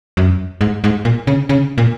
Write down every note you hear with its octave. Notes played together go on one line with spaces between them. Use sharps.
F#2
G#2
G#2
A#2
C#3
C#3
A#2